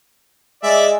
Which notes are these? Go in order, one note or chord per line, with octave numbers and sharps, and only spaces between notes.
G#3 D5 E5